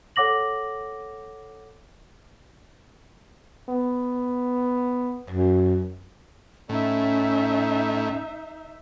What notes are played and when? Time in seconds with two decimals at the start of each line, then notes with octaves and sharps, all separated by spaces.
0.16 A4 C#5 F#5 D6 A#6 F#7
3.70 B3
5.30 F#2
6.69 A2 C#4 D#4 E5